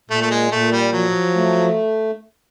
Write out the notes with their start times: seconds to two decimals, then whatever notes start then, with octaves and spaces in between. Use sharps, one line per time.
0.10 A#2 A3
0.22 A3
0.31 G#3
0.51 A#2 A3
0.72 G3
0.93 F3 F#3
1.35 A3